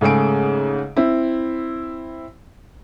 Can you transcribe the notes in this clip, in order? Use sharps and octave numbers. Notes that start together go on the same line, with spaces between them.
G#2 C#3 A3 G#4 D7
C4 E4